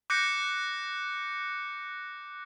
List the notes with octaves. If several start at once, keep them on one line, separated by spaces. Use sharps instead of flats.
D6 F#6 G6 A#6 C#7